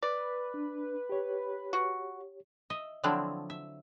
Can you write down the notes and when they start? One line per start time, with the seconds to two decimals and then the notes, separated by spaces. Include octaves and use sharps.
0.03 B4 D5
0.54 D4
1.09 G4 C#5
1.73 F#4
2.70 D#5 E5
3.04 D3 F3 F#3 C4 D4 E4
3.50 E5